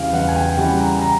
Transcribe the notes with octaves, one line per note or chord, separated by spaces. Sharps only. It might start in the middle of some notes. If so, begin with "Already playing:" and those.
Already playing: E2 C#3 E3 G3 F5
E2 F#5
G#5
G5
C#3 E3 G3 F#5
A#5
A#5